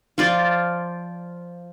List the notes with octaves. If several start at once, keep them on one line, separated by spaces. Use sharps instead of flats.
F3 F4 D5